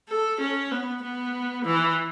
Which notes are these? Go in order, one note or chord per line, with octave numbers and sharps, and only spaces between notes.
A4
C#4
B3
B3
E3